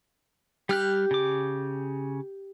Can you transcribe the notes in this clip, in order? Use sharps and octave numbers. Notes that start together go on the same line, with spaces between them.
G3 G4 F6 F#6
C#3 D6